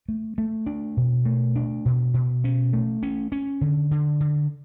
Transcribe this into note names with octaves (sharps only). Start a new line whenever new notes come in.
A3
A3
D4
B2
A3
D4
B2
B2
C#4
A3
C#4
C#4
D3
D3
D3